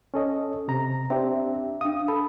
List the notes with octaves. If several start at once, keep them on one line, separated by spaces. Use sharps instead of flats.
C#4 A4 D#5
C3 A#5
C4 D4 G4 E5
D4 F5 D#6
A4 B5